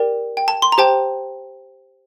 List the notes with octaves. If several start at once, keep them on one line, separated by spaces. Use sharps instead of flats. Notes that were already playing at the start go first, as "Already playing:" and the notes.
Already playing: G4 A#4 D5 G5
G5
A5
C6
A#5
G4 C5 G5 A5